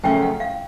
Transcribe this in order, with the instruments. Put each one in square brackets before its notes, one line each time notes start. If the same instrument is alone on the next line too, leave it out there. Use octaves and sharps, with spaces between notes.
[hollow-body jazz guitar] F#2 C#3 F3 A3 C#4 [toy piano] G5
[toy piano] F#5
F5